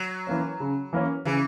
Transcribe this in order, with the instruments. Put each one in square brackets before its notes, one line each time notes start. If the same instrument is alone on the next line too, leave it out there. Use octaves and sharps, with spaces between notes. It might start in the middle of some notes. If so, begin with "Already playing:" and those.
Already playing: [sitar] F#3
[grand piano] E3 A#3 C#4
C#3
E3 A#3 C#4
[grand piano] C#3 [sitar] E3